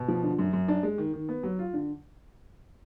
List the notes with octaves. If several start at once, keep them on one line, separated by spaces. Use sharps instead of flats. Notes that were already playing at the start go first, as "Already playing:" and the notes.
Already playing: B2
F3
D3
F#2
F#2
D4
G#3
D#3
D#3
B3
F#3
F4
D3